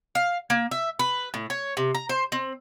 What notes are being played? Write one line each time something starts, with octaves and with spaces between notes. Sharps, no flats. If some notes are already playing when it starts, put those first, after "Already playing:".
F5
A#3
E5
B4
A2
C#5
C3
A#5
C5
C4